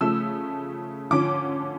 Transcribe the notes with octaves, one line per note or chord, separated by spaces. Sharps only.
C#3 F3 A3 E6
D3 F3 C#4 D6